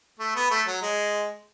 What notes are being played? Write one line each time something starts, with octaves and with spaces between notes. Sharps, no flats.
A3
B3
A3
F#3
G#3